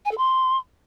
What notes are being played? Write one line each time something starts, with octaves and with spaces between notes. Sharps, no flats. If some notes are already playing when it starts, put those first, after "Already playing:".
G#5
A4
C6